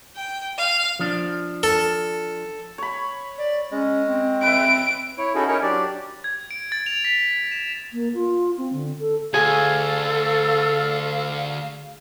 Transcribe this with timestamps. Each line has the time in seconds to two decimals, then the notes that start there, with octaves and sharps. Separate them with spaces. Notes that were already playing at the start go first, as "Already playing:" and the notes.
0.16 G5
0.58 F5
0.99 F3 D4
1.63 A4
2.78 C#5 B5
3.38 D5
3.71 G#3 C#4
4.07 C4
4.43 B4 E5 D7
5.18 E4 C#5
5.35 C#4 D#4 E4 F#4 G#4 A4
5.48 C#4 D#4 E4 A#4 C#5
5.62 F#3 D4 G4 D5
6.24 G#6
6.51 D7
6.72 A6
6.86 F7
7.04 B6
7.52 E7
7.93 A#3
8.14 F4
8.58 C4
8.73 D3
9.00 A4
9.34 D2 G#4 A4 F5 G#5